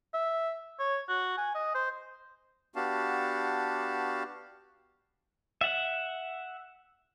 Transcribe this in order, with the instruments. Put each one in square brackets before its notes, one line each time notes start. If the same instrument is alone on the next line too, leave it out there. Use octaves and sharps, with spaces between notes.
[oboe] E5
C#5
F#4
G#5
D#5
C5
[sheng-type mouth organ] B3 D4 F#4 G4 F5 A5
[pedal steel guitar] E5 F#5